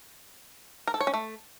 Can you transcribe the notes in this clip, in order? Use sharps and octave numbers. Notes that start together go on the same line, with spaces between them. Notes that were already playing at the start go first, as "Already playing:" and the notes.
A#4
A4
C#5
C#4
A3